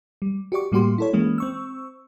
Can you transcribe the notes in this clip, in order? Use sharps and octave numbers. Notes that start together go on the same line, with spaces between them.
G3
F#4 G4 D5 C#6
A2 G3 A#3 F#4 G4 C6
E4 A4 C#5
E3 G#3 A#3 C#4
C4 C#6 E6